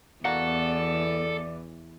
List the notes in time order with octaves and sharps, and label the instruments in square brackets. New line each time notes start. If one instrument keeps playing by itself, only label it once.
[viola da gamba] E2 E3 B3 [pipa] A#3 F#4 [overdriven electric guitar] A4 [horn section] D5